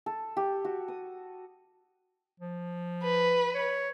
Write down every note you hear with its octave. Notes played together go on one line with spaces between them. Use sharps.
A4
G4
F#4
D#6
F3
B4
C#5